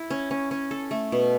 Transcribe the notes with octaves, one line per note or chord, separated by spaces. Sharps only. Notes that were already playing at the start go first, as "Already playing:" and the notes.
Already playing: E4
C#4
C#4
C#4
A4
A3
B2